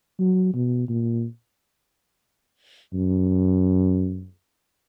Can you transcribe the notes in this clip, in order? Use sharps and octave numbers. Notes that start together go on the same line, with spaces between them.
F#3
B2
A#2
F#2